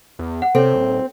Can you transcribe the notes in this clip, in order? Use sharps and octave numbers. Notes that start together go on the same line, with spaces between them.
E2
F#5
C3 C4 A4 C#5
D#1